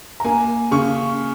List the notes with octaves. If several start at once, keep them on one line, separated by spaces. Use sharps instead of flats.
A#5
A#3 G#5
C#3 C#6